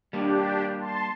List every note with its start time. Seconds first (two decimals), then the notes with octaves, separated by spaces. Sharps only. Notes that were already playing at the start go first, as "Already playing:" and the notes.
0.13 G3 A#3 D4 G4
0.79 A5 C6